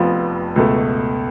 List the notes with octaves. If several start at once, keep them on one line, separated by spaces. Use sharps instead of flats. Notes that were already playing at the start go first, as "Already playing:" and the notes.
Already playing: F1 F2 F3 B3 F4
C#2 B2 A3